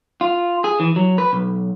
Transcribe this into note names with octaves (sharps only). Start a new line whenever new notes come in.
F4
G#4
E3
F#3
B4
B1